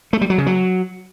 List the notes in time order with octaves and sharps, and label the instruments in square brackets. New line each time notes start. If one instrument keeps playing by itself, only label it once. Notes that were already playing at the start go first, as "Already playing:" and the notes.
[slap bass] A3
G3
F#3
C#3
F#3